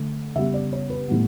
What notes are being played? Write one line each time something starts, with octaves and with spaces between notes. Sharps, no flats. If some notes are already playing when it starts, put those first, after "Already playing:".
Already playing: D3 A3
C#3 G3 B3 E5
D5
C#5
B4
A2 G3 B3